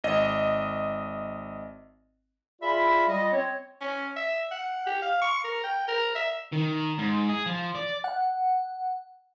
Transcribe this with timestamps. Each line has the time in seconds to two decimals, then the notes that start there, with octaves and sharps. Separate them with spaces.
0.04 G#1 D#5
2.61 F4 G#4 D5 E5 B5
3.07 G3 F4 D5 D#5
3.32 C4 C#5
3.81 C#4
4.17 E5
4.51 F#5
4.86 G4
5.02 F5
5.22 C#6
5.44 A#4
5.64 G5
5.88 A#4
6.15 E5
6.53 D#3
6.98 G#2
7.29 G#4
7.46 F3
7.75 D5
8.04 F#5